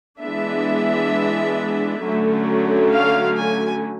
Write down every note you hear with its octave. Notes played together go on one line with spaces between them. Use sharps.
E3 G#3 B3 D4 E5
D3 F#3 A3 C#4
F5
G#5